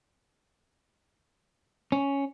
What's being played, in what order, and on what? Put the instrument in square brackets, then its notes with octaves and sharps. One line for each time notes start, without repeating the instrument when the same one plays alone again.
[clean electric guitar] C#4